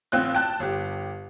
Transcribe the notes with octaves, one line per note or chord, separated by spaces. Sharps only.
A1 C4 F4 F#6
G5 A5 F#6
G1 G4